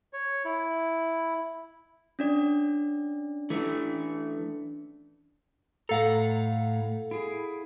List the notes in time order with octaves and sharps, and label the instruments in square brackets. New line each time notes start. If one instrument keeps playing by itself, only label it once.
[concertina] C#5
E4
[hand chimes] C#4 D4 D5
[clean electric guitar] E3 A3
[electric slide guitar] A2 A#5 [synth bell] A4 F5 F#5
[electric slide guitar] E4 G#4